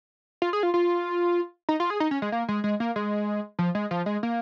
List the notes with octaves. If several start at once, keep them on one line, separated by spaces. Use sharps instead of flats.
F4
G#4
F4
F4
D#4
F4
G#4
D#4
C#4
G#3
A#3
G#3
G#3
A#3
G#3
F3
G#3
F3
G#3
A#3